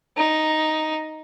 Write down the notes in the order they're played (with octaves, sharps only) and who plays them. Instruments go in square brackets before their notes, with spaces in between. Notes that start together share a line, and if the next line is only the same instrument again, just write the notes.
[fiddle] D#4